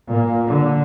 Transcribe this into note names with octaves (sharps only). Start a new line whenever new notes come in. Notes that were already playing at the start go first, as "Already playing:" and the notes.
A#2 A#3
D3